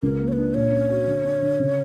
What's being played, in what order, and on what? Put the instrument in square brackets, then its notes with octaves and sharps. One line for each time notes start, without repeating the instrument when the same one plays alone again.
[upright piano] C#2 [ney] A#4
[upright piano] A#3
[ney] C#5
[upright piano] D4 [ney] B4
[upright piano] A#2 [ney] C#5
[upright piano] C#4
F#4
D3
D4
D3
C#3